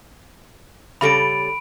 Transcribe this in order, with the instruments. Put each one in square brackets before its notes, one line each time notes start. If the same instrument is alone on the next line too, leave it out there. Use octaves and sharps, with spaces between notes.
[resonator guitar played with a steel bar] C#3 G3 A4 [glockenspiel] B5 D7